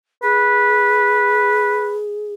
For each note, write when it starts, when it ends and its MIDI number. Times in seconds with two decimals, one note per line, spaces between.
0.23 2.34 68
0.23 2.00 71